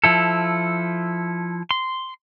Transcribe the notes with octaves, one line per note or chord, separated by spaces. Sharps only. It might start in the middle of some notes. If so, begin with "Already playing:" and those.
F3 E4 A4
C6